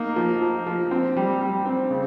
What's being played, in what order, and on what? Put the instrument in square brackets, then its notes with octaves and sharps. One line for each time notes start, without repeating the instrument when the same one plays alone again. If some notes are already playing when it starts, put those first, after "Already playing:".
Already playing: [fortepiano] A#3 D#4
F3
F3
F3
C4
G3
G3
C4
C#3